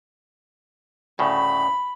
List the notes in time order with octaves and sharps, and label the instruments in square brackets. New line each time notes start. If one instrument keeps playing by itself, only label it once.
[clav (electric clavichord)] D2 A2 C#3 [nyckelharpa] B5